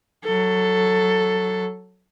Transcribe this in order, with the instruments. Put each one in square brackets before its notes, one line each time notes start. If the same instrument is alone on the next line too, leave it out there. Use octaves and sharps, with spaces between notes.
[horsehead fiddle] F#3 A4